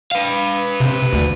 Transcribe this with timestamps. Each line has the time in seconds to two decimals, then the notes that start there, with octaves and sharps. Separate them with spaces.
0.11 B4 F5
0.80 C3
1.13 D2